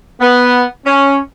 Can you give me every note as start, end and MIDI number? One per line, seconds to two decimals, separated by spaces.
0.21 0.63 59
0.86 1.17 61